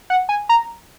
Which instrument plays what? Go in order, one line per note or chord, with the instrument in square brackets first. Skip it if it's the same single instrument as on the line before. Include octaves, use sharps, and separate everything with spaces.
[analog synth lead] F#5
G#5
A#5